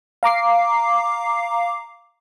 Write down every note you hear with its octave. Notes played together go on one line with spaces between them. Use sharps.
F5 A#5 D6 C7